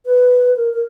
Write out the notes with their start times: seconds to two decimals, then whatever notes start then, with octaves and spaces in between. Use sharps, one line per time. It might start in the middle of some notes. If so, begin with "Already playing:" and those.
0.06 B4
0.56 A#4
0.74 A#4